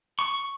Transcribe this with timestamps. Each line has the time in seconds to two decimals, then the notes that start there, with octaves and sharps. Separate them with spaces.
0.19 C#6